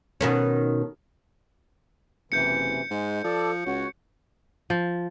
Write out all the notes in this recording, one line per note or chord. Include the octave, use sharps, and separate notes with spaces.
B2 D#3 C#4
F#1 C3 E3 G6 C#7
G#2 G#3
F3 A4 D5
C#2 F#4 C#5
F3